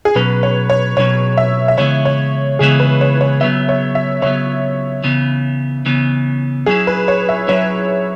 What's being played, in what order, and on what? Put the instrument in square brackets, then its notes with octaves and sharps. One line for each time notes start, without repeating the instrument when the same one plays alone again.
[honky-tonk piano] G#4
[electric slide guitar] B2 F#3 C#4 [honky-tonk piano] B4
[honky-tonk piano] C#5
C#5
[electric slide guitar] B2 F#3 C#4 [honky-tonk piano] C#5
[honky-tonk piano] E5
E5
[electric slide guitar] C#3 E3 G#3 B3 E4 [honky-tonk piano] C#5
[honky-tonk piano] C#5
[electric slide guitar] C#3 E3 G#3 B3 E4 [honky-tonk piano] G#4
[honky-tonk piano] B4
C#5
C#5
[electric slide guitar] C#3 F#3 B3 [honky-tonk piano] E5
[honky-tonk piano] C#5
E5
[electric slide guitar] C#3 F#3 B3 [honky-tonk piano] C#5
[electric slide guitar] C#3 E3 B3
C#3 E3 B3
[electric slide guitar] F#3 C#4 E4 [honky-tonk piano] G#4
[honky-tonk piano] B4
C#5
E5
[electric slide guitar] F#3 C#4 E4 [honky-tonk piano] C#5